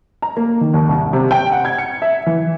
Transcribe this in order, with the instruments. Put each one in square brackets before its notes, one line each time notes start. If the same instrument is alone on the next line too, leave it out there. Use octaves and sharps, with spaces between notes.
[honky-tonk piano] A#5
A#3
D#3
D#2
C2
C3
G5
F#5
G#6
C#7
E5
E3